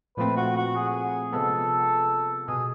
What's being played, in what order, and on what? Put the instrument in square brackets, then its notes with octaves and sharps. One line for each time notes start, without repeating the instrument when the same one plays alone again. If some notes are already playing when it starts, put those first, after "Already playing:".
[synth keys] A#2 F3 A3 C4 [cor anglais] B4
[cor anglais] F#4
F#4
G#4
[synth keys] C3 F3 G#3 B3 [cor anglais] A4
[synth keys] B2 G#3 [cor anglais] G#4